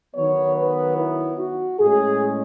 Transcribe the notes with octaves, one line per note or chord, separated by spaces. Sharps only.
D#3 F#3 B3 C#5
B4
E4
F#4
A2 G#3 C#4 G#4